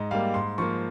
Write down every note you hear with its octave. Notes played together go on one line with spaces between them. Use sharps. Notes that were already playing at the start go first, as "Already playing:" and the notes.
Already playing: G#2 D#5
G3 A#3 F5
G#2 C6
F3 A#3 C#6